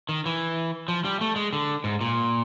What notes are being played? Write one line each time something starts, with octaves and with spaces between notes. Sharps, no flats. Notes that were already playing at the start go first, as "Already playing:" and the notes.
D#3
E3
F3
G3
A3
G#3
D3
G#2
A#2